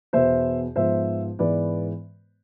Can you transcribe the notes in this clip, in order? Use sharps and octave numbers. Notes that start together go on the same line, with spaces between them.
E2 B2 B3 C5 E5
G#2 F3 B3 C5 E5
G#2 E3 G#3 B3 B4 D5